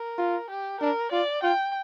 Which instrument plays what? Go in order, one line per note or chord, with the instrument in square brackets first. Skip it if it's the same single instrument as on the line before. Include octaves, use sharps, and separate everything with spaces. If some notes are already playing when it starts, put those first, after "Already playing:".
Already playing: [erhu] A#4
[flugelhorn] F4
[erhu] G4
[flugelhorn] D4 [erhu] A#4
[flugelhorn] F4 [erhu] D5
[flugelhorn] F4 [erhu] G5